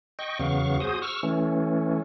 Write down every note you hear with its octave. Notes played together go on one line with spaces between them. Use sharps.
D#5 G5 C#6
E2 C#3 F#3 B3 F5 C#6
F#4 G#4 C5 D#6
C#6 E6 F6
E3 A3 C#4